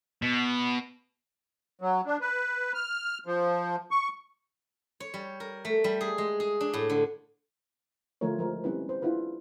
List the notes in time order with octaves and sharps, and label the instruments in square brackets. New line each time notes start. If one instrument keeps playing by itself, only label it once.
[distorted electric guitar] B2
[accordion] F#3
D4
B4
F6
F3
C#6
[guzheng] C#5
G3
A#4
A3
G3
G#4
G#3
G#4
D4
A2
D3
[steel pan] D3 F3 A3 F4 A#4 C#5
F3 G#3 A#4 C5
G3 C4 C#4 E4 B4
B4 C5
D4 E4 F4 G#4 B4